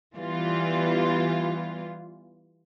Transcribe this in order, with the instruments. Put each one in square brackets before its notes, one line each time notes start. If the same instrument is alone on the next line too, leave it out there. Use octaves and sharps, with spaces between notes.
[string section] E3 G3 B3 F4